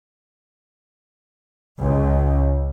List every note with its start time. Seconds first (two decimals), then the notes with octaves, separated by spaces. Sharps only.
1.80 C#2